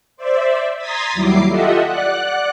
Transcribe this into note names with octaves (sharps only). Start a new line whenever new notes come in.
C5 D5 E5
A#5 C6 D#6 G#6 A6 B6
D#2 F#3 G3 E4 D6 C7
F4 G4 A4 D#5 E5 F#5
D5 F#5 F#6